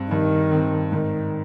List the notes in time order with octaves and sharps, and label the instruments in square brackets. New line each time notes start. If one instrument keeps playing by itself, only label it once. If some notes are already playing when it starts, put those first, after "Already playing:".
Already playing: [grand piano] G2 C4
[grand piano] G2 [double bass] D#3
[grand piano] C4
[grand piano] G#2 [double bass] D#3